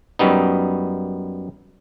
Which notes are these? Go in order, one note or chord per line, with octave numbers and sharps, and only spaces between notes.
F#2 G3 B3 D#4